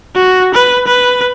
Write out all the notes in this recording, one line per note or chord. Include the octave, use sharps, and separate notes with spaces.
F#4
B4
B4